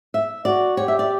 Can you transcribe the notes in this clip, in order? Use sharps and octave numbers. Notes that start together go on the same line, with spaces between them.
E5
F#4 D5
G4 C#5
E5
D5